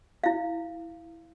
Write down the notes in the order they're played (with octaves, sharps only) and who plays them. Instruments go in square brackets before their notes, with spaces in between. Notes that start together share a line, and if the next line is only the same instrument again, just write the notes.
[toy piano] E4 F5